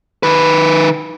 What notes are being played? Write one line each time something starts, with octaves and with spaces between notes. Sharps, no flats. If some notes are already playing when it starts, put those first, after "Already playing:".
D#3 B4